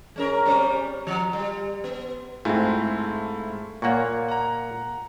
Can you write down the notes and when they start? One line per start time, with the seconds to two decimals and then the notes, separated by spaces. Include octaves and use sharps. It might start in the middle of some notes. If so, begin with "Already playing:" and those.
0.16 G#3 C#4 A#4
0.45 G3 C4 C#4
1.07 F3
1.33 G3
1.84 B3
2.45 G#2 A3 C4 E4 F4
3.82 A#2 A#3 C#5 F#5 C#6
4.28 F#5 A#5